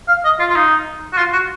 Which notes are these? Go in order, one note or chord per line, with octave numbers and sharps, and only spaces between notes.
F5
D#5
F4
F4
D#4
F#4
F4
F#4